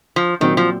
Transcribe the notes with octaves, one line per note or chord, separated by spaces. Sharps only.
F3
A#2 D#3 F#3 C4 F#4
F3